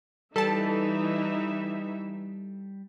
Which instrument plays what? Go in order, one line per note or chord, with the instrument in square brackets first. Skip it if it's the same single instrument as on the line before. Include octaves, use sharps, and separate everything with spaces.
[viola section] E3 D#4 E5 [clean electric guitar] G3 [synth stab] A4 A5